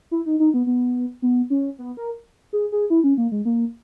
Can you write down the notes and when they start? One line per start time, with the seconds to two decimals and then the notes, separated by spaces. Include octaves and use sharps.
0.11 E4
0.26 D#4
0.40 D#4
0.54 B3
0.67 B3
1.22 B3
1.50 C#4
1.79 B3
1.97 A#4
2.53 G#4
2.72 G#4
2.90 E4
3.04 C#4
3.18 A#3
3.32 G#3
3.45 A#3